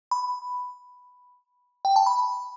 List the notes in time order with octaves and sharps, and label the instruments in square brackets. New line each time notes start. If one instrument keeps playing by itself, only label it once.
[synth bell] B5
G5
A5
B5